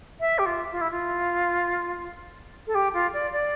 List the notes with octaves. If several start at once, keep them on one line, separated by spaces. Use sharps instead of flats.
E5
G4
F4
F4
E4
F4
A4
G4
F4
D5
D5